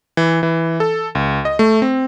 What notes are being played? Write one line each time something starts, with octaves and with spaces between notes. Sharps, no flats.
E3
E3
A4
C#2
D#5
A3
C4